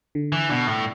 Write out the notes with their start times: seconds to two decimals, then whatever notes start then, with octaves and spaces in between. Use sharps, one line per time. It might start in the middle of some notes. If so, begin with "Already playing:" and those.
0.15 D3
0.32 E3
0.49 B2 D4
0.67 A2